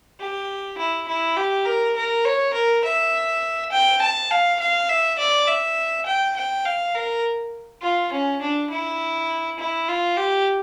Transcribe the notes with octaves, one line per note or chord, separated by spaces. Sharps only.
G4
E4
E4
G4
A#4
A#4
C#5
A#4
E5
G5
A5
F5
F5
E5
D5
E5
G5
G5
F5
A#4
F4
C#4
D4
E4
E4
F4
G4